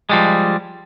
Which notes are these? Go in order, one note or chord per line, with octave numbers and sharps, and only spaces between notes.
F3 G3 G#3